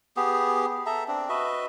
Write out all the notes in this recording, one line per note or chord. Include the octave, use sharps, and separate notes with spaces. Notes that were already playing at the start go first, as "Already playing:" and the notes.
B3 G4 G#4
A4 E5 A#5
C4 D4
F#4 B4 D#5 E5